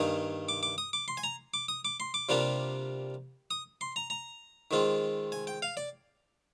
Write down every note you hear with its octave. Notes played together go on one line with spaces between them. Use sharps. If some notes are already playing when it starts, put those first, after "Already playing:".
Already playing: G2 D#3 A#3 D#4 G#5
D6
D6
D#6
D6
C6
G#5
A#5
D6
D#6
D6
C6
D6
C3 G3 A#3 D4 F4
D#6
C6
A#5
A#5
D#3 G#3 C4 F4
G#5
G5
F5
D5